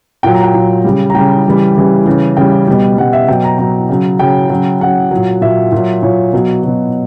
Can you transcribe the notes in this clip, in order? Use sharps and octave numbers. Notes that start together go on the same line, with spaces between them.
A#2 F#3 G5
A#5
G5
A#2 F#3
C#3 G3
A#5
C#3 G3 G5
C#3 E3 G3
C#3 E3 G3
C#3 E3 G3
C#3 E3 G3 G5
B2 G3
B2 G3 F#5
E5
B2 F#3 G5
A#5
B2 F#3 A#5
C#3 F#3
C#3 F#3 G5
C#3 F#3
C#3 F#3 F#5
A#2 F#3
A#2 F#3 E5
A#2 F#3
A#2 F#3 C#5
B2 F#3
B2 F#3